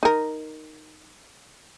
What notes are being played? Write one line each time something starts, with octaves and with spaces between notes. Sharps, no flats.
D#4 A#4